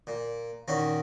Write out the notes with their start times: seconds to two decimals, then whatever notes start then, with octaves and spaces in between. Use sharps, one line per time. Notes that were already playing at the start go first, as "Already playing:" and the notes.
0.07 A#2
0.68 A#2 D#3 C#4 F#4